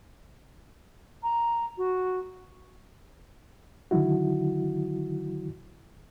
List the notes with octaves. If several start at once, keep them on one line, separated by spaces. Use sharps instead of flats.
A#5
F#4
D3 D#3 F#3 E4 F#4